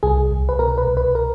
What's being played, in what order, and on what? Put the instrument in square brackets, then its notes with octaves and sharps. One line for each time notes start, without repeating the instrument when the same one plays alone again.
[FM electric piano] C2 G#4
C2
B4
B2 A#4
B4
C2
B4
A#4